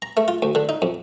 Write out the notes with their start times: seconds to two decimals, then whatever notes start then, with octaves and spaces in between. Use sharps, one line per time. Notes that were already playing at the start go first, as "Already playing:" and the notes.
0.02 A#5
0.17 A3
0.28 F4
0.42 D2
0.55 D3
0.69 D#4
0.82 F2